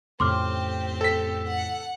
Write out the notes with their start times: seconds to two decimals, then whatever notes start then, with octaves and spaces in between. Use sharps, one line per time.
0.20 F2 A2 C#3 C4 G4 C6 D6 F6
1.01 A4 B6
1.47 F#5